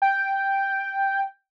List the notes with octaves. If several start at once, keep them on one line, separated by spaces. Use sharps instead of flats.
G5